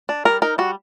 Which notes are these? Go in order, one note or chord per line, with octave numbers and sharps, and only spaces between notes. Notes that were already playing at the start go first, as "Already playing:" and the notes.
D4
G3 A#4
D#4 A#4
G3 F#4